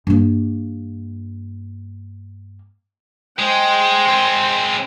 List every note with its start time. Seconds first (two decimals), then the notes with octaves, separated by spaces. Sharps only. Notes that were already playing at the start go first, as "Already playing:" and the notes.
0.07 G2 A#3
3.39 G#3 C5 G5
4.07 G#3 C4